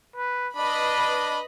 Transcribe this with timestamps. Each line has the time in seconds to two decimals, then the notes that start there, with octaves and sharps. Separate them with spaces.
0.16 B4
0.57 D4 B4 D#5 B5